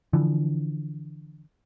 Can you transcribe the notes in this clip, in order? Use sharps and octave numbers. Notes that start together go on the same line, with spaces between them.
D3 E3 F3